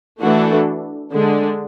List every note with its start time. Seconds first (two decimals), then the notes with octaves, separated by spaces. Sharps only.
0.20 E3 A3 D4 F#4 A4
1.12 D3 G#3 D4